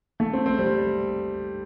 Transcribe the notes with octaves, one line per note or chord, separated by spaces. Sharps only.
A3
C4
C4
G3